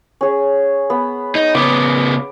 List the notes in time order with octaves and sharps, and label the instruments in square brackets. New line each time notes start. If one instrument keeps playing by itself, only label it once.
[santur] C#4 G#4
B3
[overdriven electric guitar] D#4
[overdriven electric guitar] C#3 B3 [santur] D6